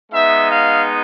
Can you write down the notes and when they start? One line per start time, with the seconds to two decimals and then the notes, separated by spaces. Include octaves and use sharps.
0.12 G#3 B3 D#4 E5
0.49 F5